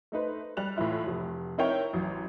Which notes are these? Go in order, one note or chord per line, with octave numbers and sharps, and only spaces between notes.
A3 D#4 B4 C5
G3 F#6 F7
A2 E3 E4 F4
F1
C4 D#4 E4 A#4 C#5 G5
A1 F#2